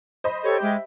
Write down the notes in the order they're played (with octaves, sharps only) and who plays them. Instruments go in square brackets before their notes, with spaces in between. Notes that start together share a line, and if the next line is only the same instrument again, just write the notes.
[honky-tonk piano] C5 D#5 B5
[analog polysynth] G4 G5 [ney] A4 [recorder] C#5
[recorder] G#3 [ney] E5